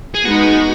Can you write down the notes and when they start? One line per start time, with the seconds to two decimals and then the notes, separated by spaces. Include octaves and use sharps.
0.15 G#4
0.25 G#3 B3 D#4 F#4